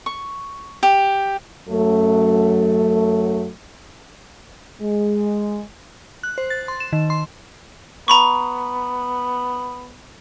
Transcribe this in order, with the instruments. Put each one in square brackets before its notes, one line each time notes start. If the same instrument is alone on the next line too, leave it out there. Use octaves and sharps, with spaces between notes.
[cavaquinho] C#6
G4
[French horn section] F#2 F#3 A3
G#3
[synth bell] F#6
C5
A6
C6
E7
D#3
C6
[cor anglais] B3 [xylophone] A#5 B5 C#6